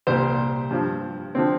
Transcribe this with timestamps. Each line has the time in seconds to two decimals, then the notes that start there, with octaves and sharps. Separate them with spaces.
0.07 C2 A#2 G3 C5
0.71 G2 F3
1.35 D3 F3 C4